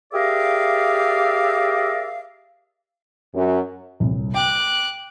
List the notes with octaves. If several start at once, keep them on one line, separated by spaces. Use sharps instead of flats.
G4 G#4 A#4 D5 E5 F5
F#2
D#1 C2
G5 D6 F#6